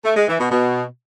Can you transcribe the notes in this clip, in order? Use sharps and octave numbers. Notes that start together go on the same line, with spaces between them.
A3
G#3
E3
B2
B2